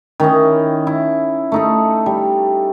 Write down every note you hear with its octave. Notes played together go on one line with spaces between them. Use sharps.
D#3 C#4 E4 D#5
E4
A3 D#4 A4
G3